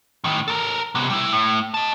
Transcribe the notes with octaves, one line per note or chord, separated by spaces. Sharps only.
A2 D#3
A4 A#4
C3 B3
G3 E4
A2
D#5 A5